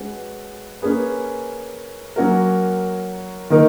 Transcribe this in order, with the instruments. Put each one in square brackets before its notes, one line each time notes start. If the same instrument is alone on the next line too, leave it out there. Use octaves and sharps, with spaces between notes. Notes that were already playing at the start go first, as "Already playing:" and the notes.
Already playing: [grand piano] G#3 C#4 F#4 B4
A#3 C#4 G#4 B4
F#3 A#3 C#4 F#4 A#4
D#3 A#3 D#4 A#4